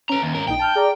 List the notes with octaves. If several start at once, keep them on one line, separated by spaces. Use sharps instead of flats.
C#4 B4 A#5
D#2
G#2 A#4
A#1 D#4 G5
A5 F6 G6
G#4 D5 A#5